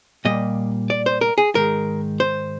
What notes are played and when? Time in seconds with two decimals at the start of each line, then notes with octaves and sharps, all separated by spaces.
0.25 A#2 G3 A#3 D#5
0.90 D5
1.06 C5
1.21 A#4
1.38 G#4
1.55 G#2 D#3 G#3 A#4
2.20 C5